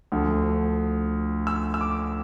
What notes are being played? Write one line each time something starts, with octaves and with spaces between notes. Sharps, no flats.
D2 D3 F3
E6
E6
D6